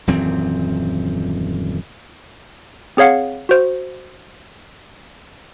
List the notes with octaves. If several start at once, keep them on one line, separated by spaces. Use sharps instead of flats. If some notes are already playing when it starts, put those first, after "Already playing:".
D#1 F#2 E3 C4
C4 G#4 C#5 F5 F#5
F#4 C5